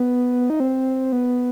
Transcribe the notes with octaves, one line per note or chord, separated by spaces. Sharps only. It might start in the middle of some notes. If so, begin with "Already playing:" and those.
Already playing: B3
D#4
C4
B3